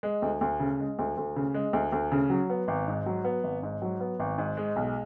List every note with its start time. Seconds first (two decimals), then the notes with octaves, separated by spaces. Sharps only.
0.03 G#3
0.22 D2
0.41 D2
0.60 C#3
0.80 G#3
0.99 D2
1.17 D2
1.36 C#3
1.54 G#3
1.73 D2
1.92 D2
2.12 C#3
2.30 F#3
2.50 B3
2.68 G#1
2.88 G#2
3.06 F#3
3.24 B3
3.44 G#1
3.63 G#2
3.82 F#3
4.00 B3
4.20 G#1
4.38 G#2
4.57 G#3
4.76 B1